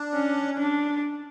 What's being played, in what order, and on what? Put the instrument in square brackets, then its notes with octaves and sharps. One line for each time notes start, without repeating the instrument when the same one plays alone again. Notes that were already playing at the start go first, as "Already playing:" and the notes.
Already playing: [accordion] D4
[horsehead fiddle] C#4
D4